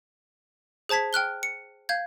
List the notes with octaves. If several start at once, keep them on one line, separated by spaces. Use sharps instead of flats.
G#4 C5 A5 G#6 B6
G5 F6 F#6 G7
C#7
F5 G6 G#6